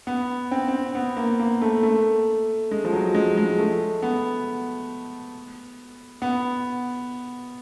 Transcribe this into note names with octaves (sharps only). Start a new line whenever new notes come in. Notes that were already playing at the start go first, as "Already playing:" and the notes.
B3
C4
C4
B3
A#3
A#3
A3
A3
G#3
F3
F#3
G#3
G#3
A3
B3
B3